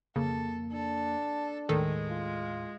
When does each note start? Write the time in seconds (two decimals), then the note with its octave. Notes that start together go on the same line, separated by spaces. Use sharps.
0.16 F2 C#3 A#3 A4
0.73 D4 A4
1.69 D#2 A2 D#3 G#3 A4
2.10 F4